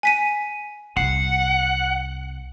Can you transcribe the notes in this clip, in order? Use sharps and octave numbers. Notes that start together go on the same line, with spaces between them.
G#5 B6 D#7
C2 E4 F#5 C7